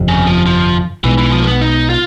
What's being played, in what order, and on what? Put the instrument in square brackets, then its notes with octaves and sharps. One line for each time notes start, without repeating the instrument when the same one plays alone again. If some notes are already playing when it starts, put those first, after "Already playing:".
Already playing: [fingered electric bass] G1 F2 C3
[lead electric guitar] C#3
F3
F3
[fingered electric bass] B1 B2 G#3 [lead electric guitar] E3
[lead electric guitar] E3
F3
A#3
B3
D#4
F4